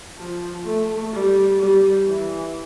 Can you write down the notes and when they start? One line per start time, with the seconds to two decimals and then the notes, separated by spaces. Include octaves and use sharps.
0.18 F3
0.65 A3
1.13 G3
1.60 G3
2.07 E3